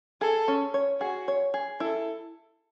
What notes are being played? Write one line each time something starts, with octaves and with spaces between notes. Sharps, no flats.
G#4 A4
C#4
C#5
F#4 G#4
C#5
G#4
E4 A4